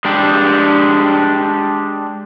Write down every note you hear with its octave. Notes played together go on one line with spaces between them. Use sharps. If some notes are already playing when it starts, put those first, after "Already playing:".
G#3 D4 G4